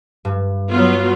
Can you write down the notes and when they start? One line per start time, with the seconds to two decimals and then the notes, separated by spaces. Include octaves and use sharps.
0.25 G2
0.71 F#3 B3 F4